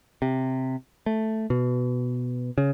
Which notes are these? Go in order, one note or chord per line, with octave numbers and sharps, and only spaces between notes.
C3
A3
B2
C#3